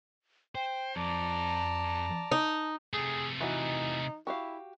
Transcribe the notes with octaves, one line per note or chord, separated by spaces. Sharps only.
C5 G5
F2 D5 A5 A#5
D#4
C3 A3 G#4
E3 D#4 F#4
E4 F#4 G4 F5